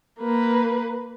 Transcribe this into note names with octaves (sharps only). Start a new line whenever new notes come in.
A#3 B4